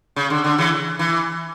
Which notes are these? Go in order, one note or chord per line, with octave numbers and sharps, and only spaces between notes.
C#3
D3
D3
C#3 E3
E3